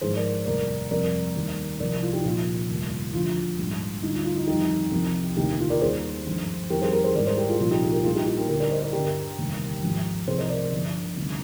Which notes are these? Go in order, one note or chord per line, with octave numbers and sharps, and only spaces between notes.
G#1 G#2 F3 G#4 C5
A#4 D5
F1 D#2 D#3 G3 A#4 D5
F2 C3 G3 A#4 D5
D#2 D#3 G3
C2 C3 F3 A#4 D5
F4
D#4 G4
C2 A#2 F3 F4
F1 D#2 D#3 G3
D2 D3 F3 F4
A#1 G#2 G3
D2 D3 G3 D#4
F4
F4
D#4
F2 D#3 G3 D#4 G4
C2 C3 F3
F1 D#2 D3 D#4 G4
F4
A#4 D5
D#2 D#3 G3 G#4 C5
G#1 G2 F3
F2 D#3 G3 G4 A#4
G#4 C5
G4 A#4
G#4 C5
G#1 G#2 G3 A#4 D5
G#4 C5
G4 A#4
F4 G#4
C2 A#2 F3 F4
D#4 G4
F4 G#4
G4 A#4
A#1 A#2 G3 F4 G#4
D#4 G4
D#4 G4
G4 A#4
D2 D3 G3 G4 A#4
A#4 D5
C5 D#5
A#4 D5
G1 G2 D3 G4 A#4
F1 D#2 D#3 G3
G#1 G#2 F3
C2 C3 F3 G#4 C5
C5 D#5
A#4 D5
G1 G2 D3 F3
D2 C3 D#3 G3